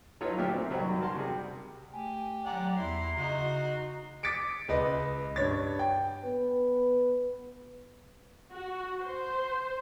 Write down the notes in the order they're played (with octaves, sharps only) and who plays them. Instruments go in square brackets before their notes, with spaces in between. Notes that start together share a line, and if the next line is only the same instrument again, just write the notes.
[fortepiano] F#3 D#4 F4 A4 B4 C#5
D2 A#2 G4 E5 F6
A#3 C4
C2 F#2 B2 D#3 F#3 G3
F#4 A#4 A5 C6
C3 G3 G#4
[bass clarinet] A3 [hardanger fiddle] G4 [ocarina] G#5
[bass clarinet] F#3 [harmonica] D5 F#5 [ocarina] A#5
[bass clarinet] E2 [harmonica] E4 [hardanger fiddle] C6
[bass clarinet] C#3 [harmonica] D#4 F#4
[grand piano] D6 D#6 A6 B6 C#7 D7
C#2 B4 D#5
G2 C#5 A6
G5
[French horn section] B3 B4
[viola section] F#4
C5